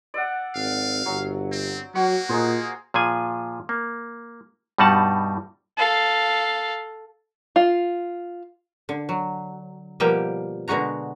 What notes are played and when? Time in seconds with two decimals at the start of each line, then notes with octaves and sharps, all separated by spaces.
0.14 D5 E5 F#5
0.55 G#1 F5
1.06 G1 F#3
1.52 C4
1.95 F#3 A#3 F#4 F#5
2.29 A#2 D#4 G#4 C5
2.94 A#2 F3 G#4 G#5
3.69 A#3
4.78 G2 B2 G3 D#4 F#5 A5
5.77 A4 F5
7.56 F4
8.89 D3
9.09 F#3
10.00 B2 F3 G3 A#3 G5
10.68 B2 D3 G#3 F#4 A#5